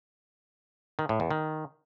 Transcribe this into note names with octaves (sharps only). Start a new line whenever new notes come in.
D#3
A2
E2
D#3